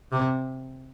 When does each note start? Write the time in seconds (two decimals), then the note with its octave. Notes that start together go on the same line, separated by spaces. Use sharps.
0.12 C3